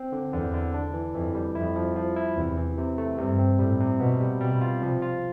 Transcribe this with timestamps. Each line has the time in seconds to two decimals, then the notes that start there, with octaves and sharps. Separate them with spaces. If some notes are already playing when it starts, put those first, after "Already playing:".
Already playing: C4
0.12 D3
0.33 E2 D3
0.54 D3
0.74 D4
0.94 E3
1.14 F2 E3
1.35 G3
1.55 F2 E4
1.76 F3
1.96 F3
2.16 E4
2.36 E2 C3
2.57 E3
2.78 C3
2.98 A3
3.18 G2 C3
3.39 C4
3.59 A2 G3
3.80 C3
4.00 B2 B3
4.21 G3
4.41 B2 G3
4.61 F4
4.82 C3 F3
5.02 F4